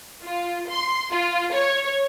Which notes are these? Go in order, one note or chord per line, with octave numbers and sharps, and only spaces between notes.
F4
C6
F4
C#5